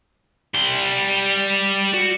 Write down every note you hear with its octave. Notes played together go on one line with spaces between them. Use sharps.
G3 C6
F#4